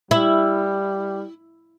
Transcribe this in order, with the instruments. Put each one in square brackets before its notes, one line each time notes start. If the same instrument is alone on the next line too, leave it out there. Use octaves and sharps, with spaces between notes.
[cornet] G3 [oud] E4